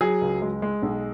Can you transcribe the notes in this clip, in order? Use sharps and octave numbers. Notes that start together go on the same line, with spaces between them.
F#3 G#4
C#2
G#3
G#3
B1